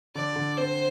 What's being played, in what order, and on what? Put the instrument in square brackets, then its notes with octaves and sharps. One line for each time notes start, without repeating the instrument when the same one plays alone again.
[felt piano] D3 [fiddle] D5
[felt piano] D3
[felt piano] C4 [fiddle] C5